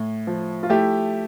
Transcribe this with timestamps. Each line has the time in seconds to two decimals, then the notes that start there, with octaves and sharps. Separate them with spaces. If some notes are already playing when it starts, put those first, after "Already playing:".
Already playing: A2
0.27 F3
0.63 F4
0.70 A3 E4 G4